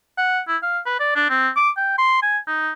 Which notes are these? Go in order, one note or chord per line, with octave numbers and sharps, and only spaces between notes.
F#5
E4
F5
B4
D5
D4
C4
D6
G5
C6
G#5
D#4